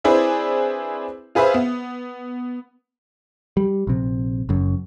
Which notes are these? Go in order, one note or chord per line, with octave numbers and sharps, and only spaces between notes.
C4 D4 E4 G#4 B4 C5
F4 G#4 B4 C5 E5
B3
G3
A#1 C3
F#1 F#2